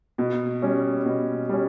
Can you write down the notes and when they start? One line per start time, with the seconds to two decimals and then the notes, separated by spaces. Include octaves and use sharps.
0.18 B2
0.62 G3 C#4
1.06 B2
1.49 G3 C#4